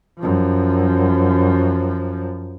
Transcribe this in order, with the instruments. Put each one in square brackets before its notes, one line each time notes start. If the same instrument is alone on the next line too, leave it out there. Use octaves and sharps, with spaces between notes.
[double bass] F#2 F3